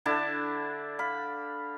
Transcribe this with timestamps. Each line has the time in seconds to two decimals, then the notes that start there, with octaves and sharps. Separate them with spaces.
0.06 D3 D4 E4 A5
0.99 F5 B5